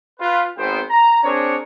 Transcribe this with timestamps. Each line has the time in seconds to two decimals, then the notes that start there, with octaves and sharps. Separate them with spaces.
0.20 F4 B4
0.58 G#1 B3 C5 G5
0.88 A#5
1.24 C4 D4 G#4 A#4 C#5